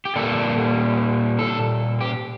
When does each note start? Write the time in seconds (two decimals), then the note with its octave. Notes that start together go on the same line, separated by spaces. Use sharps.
0.05 G4
0.16 A#2 G3 A#3 A4
1.39 A4
2.01 G4